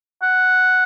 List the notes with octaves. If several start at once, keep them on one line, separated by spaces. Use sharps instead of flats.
F#5